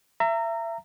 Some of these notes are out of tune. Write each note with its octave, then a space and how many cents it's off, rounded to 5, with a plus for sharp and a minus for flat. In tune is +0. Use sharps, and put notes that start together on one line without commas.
E5 +30 A#5 -20